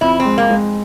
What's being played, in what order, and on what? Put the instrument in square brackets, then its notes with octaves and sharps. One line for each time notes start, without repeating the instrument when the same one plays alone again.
[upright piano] F2 [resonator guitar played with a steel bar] E4
[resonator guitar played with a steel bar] C4
[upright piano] G#3
[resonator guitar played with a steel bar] A#3
[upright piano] G#3